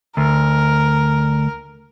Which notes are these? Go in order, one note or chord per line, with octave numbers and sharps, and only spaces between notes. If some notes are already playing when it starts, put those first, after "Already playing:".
D2 A#4